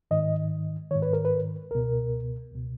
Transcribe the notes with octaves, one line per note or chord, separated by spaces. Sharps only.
G#2 D#3 D#5
G#2 D#3 C#5
B4
A#4
B4
C#2 B2 A#4
C#2 B2